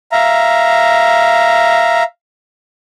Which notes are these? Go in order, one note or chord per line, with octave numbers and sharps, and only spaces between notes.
E5 F5 A#5